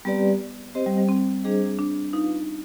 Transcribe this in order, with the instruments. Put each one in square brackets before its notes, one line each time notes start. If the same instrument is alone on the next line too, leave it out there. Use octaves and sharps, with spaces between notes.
[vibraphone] G3 C4 G4 B4 D5 [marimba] B3
[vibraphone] C4 G4 C5 D#5
[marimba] G3
G3
C4
[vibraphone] G3 D4 G#4 C5 D#5
[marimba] D4
[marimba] D#4 [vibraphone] F4 B4 F5